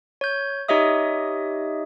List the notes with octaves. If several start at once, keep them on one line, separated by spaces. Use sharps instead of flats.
C#5 G6
D#4 G4 C#5 D#5 E5 D#6